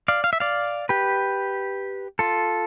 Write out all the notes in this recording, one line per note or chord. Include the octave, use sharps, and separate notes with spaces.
D5 F5
F5
E5
D5 F5
G4 B4
F4 A4